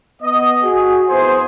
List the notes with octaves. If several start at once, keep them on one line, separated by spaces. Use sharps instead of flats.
B3 D#5
F#4 G#4
F2 B3 E4 G#4 C5